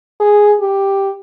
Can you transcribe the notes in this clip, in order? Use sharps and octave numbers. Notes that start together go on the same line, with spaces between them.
G#4
G4